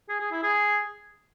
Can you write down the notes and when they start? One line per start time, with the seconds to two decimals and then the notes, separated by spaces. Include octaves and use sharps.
0.09 G#4
0.20 G#4
0.32 E4
0.43 G#4